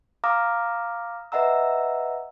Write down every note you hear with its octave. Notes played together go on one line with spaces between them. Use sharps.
F5 A#5 D6 D#6 F6 A#6
B4 D#5 E5 F#5 A#5 E6